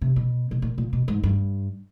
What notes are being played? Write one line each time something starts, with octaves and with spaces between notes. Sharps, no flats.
C3
B2
B2
A#2
A#2
B2
G#2
G2